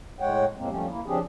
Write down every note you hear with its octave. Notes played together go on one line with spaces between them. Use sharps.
A2 G#3 C#5 F#5 G5
F2 A2 G#3 A#3 C4
C#3 F3 G3 A3 C#4 G4
A#3 E4
C#3 F3 C4 D4 G4 G#4